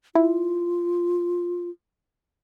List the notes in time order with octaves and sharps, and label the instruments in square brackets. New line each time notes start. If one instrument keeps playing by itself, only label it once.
[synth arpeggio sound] E4 [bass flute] F4